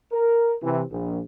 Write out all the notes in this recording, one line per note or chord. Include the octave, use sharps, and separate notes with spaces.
A#4
C3 E3
A#1